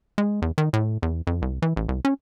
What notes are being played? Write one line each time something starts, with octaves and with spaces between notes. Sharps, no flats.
G#3
E2
D#3
A2
E2
F2
C2
E3
A1
C2
C#4